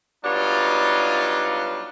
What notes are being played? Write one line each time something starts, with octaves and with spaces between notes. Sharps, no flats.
F#3 G3 B3 D4 D#4 F4